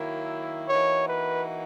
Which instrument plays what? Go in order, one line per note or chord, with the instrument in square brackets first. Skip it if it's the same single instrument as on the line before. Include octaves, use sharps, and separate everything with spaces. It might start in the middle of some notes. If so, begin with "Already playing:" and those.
Already playing: [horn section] D#3 F#3 A#3 E4
[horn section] E3 A#3 D#4 F#4 [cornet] C#5
[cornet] B4